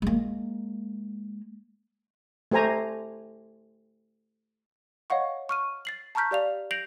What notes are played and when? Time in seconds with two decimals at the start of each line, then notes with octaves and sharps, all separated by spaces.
0.02 G#3 A#3
2.51 A3 G4 C5 G#5 A#5
5.10 C#5 D#5 F5 F#5 C#6
5.49 C#6 F6 D#7
5.85 A6 C7 F#7
6.15 A5 A#5 C#6 F6 G6 B6
6.31 G4 D5 F5 F7
6.71 G6 A#6 C7 D7 F7 F#7